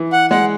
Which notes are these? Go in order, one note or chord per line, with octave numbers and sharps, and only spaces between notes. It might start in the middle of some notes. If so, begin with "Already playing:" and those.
Already playing: E3
F#5
G#3 F#5